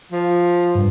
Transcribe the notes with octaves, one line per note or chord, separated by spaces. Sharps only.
F3
G2